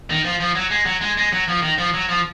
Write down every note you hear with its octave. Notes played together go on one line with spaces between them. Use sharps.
D#3
F3
F3
F#3
G#3
F#3
G#3
G#3
F#3
F3
D#3
F3
F#3
F3